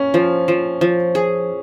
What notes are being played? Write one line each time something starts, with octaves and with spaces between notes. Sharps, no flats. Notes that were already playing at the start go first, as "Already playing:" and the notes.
Already playing: A#3 C#4
F3
F3
F3
G#4